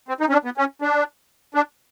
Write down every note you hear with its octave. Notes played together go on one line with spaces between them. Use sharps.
C4
D#4
C#4
D4
B3
C#4
D4
D4